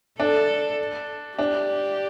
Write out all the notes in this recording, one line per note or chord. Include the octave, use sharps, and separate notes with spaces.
D4 A4
D4 G4